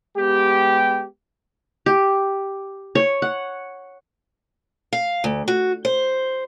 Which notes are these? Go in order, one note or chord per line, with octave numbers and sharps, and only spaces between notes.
G#3 B3 G4
G4
C#5
F#5
F5
D2
F#4
C5